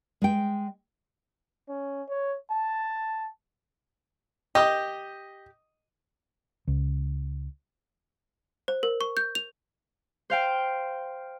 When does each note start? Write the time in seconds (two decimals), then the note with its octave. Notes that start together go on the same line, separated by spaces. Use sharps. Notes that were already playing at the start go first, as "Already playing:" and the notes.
0.22 G#3 G5
1.69 C#4
2.08 C#5
2.51 A5
4.55 G4 D#5 D#6
6.67 C#2
8.68 C5
8.83 A#4
9.01 C#6
9.17 G6
9.35 F7
10.30 C5 F5 G5